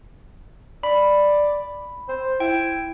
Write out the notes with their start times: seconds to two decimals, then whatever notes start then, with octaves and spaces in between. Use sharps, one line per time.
0.83 D5 B5
2.08 C5
2.40 E4 G5